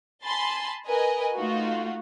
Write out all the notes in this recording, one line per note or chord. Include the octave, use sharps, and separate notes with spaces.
G#5 A5 B5 C6 A6
A#4 B4 D#5 G#5
A3 D#4 F4 F#4